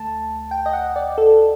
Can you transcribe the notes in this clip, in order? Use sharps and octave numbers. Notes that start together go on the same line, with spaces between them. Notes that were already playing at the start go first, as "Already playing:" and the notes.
Already playing: D2 A3 A5
G5
D#5
F#5
D5
A4